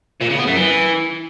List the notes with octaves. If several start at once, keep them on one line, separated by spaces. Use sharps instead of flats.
A#2
C#3
B3
F#2
E3